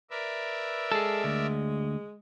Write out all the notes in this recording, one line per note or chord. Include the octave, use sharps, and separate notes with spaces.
A#4 B4 D5 E5
G#3 G#4 A4
D2